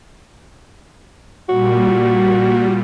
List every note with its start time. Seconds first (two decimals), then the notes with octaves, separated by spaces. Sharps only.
1.49 A#2 G3 F#4